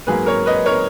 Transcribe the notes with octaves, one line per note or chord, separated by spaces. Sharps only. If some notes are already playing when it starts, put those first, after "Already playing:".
G#2 F#3 A#3 G#4 B4
A#4 C#5
B4 D#5
A#4 C#5